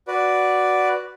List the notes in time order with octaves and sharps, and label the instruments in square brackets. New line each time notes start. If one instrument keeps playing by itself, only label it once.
[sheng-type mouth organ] F#4 B4 D5